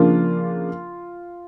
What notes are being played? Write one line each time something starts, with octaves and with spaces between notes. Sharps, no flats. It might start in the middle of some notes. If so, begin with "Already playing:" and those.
Already playing: C#3 F3 A#3 D4 F4